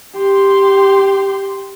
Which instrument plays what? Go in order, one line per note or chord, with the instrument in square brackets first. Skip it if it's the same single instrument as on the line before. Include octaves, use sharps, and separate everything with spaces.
[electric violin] G4 C6